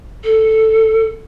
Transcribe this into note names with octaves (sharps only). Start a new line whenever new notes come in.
A4